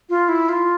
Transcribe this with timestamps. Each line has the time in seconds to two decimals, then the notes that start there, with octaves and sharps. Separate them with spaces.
0.10 F4
0.29 E4
0.49 F4